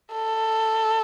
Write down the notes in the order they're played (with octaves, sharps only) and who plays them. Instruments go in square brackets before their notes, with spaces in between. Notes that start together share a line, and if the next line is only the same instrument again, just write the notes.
[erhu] A4